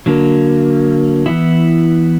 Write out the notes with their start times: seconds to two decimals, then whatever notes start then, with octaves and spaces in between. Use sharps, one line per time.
0.06 D3 F#3 A#3
1.26 E3 B3 E4